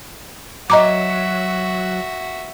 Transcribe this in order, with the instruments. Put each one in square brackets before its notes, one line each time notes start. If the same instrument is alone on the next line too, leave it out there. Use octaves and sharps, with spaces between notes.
[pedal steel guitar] F#3 [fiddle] F#4 E5 [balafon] D#5 A#5 D6